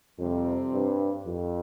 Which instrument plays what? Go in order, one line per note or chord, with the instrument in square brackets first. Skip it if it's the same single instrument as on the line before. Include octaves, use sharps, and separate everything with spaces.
[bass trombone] F2 [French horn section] C3 G3 C4
[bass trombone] G2
F2